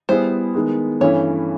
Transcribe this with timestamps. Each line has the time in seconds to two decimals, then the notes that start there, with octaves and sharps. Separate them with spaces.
0.09 G3 B3 E4 G#4 C5
0.54 D#3 G#3 B3
1.00 G2 E3 A3 C#4 E4 C#5